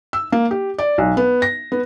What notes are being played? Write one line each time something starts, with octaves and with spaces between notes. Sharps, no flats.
E6
A#3
G4
D5
B1
B3
A#6
B3